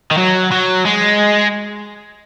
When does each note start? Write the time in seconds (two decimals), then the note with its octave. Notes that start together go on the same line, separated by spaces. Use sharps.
0.11 D#3
0.18 F#3
0.52 F#3
0.86 G#3